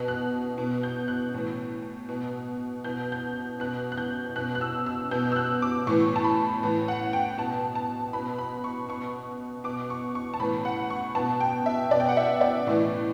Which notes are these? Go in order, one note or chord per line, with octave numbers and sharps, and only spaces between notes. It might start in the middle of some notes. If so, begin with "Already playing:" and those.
Already playing: B2
F#6
B2
G6
F#6
A2 E3
B2
B2 G6
G6
B2 F#6
F#6
G6
B2 F#6
F#6
E6
E6
B2 G6
E6
F#6
D6
A2 E3 C#6
A5
B5
A2 E3
F#5
G5
B2 A5
A5
B2 B5
B5
C#6
B2 C#6
B2 D6
C#6
C#6
A5
A2 E3 B5
F#5
C#6
B2 A5
G5
E5
B2 D5
G5
F#5
E5
D5
A2 E3